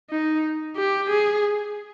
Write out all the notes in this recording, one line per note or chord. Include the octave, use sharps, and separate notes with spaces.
D#4
G4
G#4